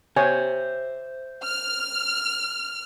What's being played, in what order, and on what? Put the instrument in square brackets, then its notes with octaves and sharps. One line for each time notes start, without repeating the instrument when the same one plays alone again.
[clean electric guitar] C5 E5 [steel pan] C#5 G#5
[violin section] F6